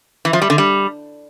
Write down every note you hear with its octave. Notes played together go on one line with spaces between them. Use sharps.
E3
F3
G3
D3
G3